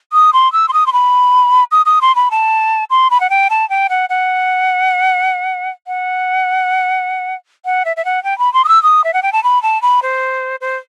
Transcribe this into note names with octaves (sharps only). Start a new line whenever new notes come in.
D#6
C6
E6
C6
D#6
C6
B5
D#6
D#6
C6
B5
A5
C6
B5
F#5
G5
A5
G5
F#5
F#5
F#5
F#5
E5
E5
F#5
G5
B5
C6
D#6
E6
D#6
E5
F#5
G5
A5
B5
A5
B5
C5
C5